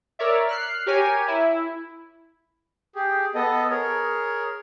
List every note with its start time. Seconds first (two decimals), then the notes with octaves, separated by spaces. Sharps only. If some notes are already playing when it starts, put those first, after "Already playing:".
0.19 A#4 C#5 D5 E5
0.49 F6 F#6 C7
0.86 G4 A#4 C#5 G#5
1.28 E4
2.95 G4 G#4
3.35 B3 A4 D#5
3.70 G#4 A#4 C#5